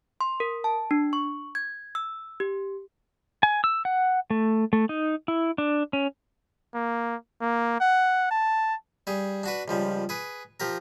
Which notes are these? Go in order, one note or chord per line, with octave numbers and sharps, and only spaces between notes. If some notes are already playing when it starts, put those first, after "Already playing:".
C6
A#4
A5
D4
C#6
G#6
E6
G4
G#5
E6
F#5
A3
A3
D#4
E4
D4
C#4
A#3
A#3
F#5
A5
G3 G#4
D4 F#4 B4
C#2 F3 G3
G#4 B4
F3 G4 A#4